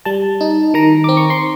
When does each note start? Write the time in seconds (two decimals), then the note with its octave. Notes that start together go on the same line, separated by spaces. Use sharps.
0.05 G3 A5
0.41 D#4
0.74 D#3 A#5
1.04 C4 D6
1.17 C#6
1.30 C6